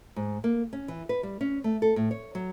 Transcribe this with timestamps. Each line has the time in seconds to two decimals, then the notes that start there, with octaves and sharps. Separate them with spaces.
0.16 G#2
0.44 A#3
0.73 C#4
0.88 E3
1.09 B4
1.23 G3
1.41 C#4
1.64 A3
1.82 A4
1.96 A2
2.11 C#5
2.35 F#3